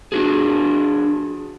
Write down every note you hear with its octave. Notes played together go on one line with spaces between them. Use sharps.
D4 F#4 G#4